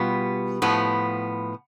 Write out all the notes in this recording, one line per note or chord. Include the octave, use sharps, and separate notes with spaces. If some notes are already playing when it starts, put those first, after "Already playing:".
Already playing: B2 G3 B3 F4
A2 F3 B3